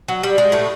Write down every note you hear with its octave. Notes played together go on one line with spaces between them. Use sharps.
F#3
G3
G#3
A2 A3